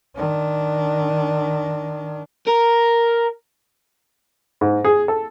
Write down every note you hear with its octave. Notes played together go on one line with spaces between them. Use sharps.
D#3 D4
A#4
G#2
G#4
A4